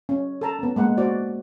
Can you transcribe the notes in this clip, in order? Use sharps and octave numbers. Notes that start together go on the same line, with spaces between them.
C#4
A4 A#4 A5 A#5
B3 C#4
G#3 A#3 F#5
F#4 C5 D5